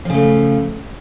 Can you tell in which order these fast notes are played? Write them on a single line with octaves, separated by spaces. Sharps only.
F3 C#3 A3